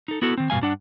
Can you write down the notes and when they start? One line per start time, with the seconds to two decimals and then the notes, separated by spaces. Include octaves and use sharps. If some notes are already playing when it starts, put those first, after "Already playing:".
0.08 D#4 A4
0.22 B3 E4 F#4 A4
0.38 D#3 C4
0.50 G2 B2 G#3 F5 G#5
0.62 G2 D4 F#5